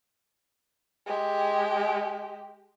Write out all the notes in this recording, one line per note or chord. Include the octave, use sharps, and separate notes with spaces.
G#3 G4